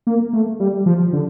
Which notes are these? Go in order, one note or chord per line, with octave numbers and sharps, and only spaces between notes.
A#3
A3
G3
F3
D3